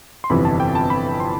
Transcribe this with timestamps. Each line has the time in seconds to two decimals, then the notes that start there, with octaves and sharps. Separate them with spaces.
0.24 C6
0.30 G1 F2 C3 E3 B5
0.45 A5
0.60 G5
0.75 A5
0.90 B5
1.20 C6